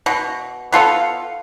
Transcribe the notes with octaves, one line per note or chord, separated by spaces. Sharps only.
B2
B3 F4 A4 F5